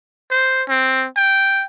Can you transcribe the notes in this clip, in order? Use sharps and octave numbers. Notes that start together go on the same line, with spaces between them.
C5
C4
G5